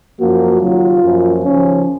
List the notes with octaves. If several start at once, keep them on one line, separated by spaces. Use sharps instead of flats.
F#2 F3 A#3 F#4
D#2 C#3 F#3 F4
F#2 F3 A#3
D#2 C#3 F3 C#4